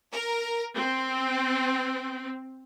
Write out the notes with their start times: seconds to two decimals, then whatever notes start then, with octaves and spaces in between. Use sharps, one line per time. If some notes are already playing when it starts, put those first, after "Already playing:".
0.13 A#4
0.76 C4